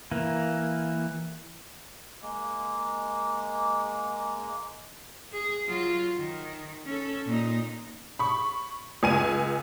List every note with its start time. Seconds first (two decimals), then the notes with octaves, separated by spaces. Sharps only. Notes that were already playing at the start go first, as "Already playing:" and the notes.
0.11 E3 A#3
2.22 G#3 A#3
5.33 G#4
5.65 F#3 F4
6.18 D#3
6.86 C#4 A4
7.26 A#2 D#4
8.19 B5 C#6
9.03 C#2 G#5 D#7